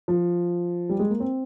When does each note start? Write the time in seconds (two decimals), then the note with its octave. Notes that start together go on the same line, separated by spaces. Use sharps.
0.08 F3
0.89 G3
0.99 G#3
1.10 A#3
1.20 C4